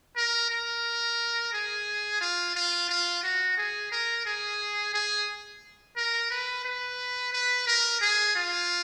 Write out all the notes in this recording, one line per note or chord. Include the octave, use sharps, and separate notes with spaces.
A#4
A#4
G#4
F4
F4
F4
F#4
G#4
A#4
G#4
G#4
A#4
B4
B4
B4
A#4
G#4
F4